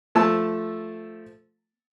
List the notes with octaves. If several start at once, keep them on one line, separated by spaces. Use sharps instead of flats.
F3 A3 A5 E6